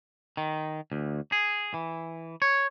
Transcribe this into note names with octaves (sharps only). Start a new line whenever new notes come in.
D#3
D2
G#4
E3
C#5